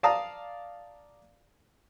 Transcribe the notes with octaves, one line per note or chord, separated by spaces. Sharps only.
D5 F5 A5 A#5 D#6